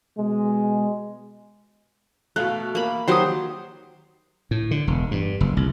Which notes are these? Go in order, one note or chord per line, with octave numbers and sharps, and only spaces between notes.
B2 G#3
B2 A3 F5 F#6
A#3 B5
D#3 F#3 G4 C5 C6 D#6
A2
D3
E1
G2
F#1
C2